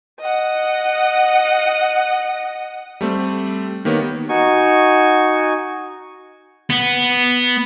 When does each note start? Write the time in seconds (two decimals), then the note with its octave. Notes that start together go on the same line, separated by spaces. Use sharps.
0.20 D#5 F#5
3.01 G3 A3 C4
3.85 D#3 A#3 B3 G4 C#5
4.29 D#4 F#4 G#5 C#6
6.70 B3